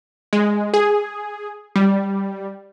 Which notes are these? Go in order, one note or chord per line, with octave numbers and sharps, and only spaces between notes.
G#3
G#4
G3